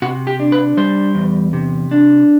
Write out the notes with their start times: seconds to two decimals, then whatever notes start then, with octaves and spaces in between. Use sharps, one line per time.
0.02 C3 F#4
0.27 G4
0.40 D4
0.52 B4
0.77 G3 C5
1.15 E2
1.53 C3
1.91 D4